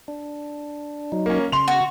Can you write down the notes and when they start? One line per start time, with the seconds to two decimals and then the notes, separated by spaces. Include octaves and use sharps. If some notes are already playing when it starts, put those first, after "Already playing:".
0.08 D4
1.12 F#3 D#4
1.26 A#3 C#4
1.52 C#3 C6 F7
1.68 F#4